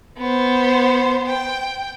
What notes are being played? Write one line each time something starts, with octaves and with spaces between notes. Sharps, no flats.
B3 C5
G5